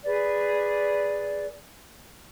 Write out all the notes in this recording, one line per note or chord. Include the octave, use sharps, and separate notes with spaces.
G#4 B4 D5